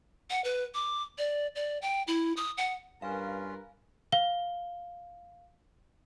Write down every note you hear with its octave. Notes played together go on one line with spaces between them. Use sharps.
F#5
B4
D6
D5
D5
G5
E4
D#6
F#5
G2 C#4 F4 A#4 B4 F5 G#5
F5 G7